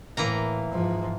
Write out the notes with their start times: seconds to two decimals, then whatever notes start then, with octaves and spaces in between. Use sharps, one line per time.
0.17 A2 E3 A#3 A#5
0.71 G#2 F3